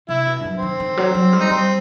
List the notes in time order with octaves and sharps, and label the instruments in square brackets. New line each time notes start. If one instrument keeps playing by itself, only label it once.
[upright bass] C3 [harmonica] E4
[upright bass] B2
G2
F#2
[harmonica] C4
[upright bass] D#3
D#3
F#3
F#3
G3
[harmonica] D#4
[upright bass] G3 [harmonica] C4